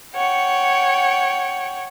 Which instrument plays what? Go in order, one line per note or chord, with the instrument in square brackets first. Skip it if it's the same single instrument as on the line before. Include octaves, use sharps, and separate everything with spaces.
[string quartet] C#5 F#5 G5